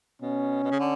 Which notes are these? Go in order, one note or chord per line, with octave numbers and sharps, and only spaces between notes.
B2 C#4
B2
C#3
D3